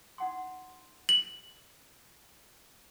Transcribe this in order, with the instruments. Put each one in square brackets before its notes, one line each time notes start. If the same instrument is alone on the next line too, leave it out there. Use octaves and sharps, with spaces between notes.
[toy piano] D#4 F#5 C6
[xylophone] F#7